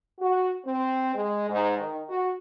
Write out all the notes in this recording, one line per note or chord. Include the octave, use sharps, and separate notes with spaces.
F#4
C4
G#3
G#2
D#3
F#4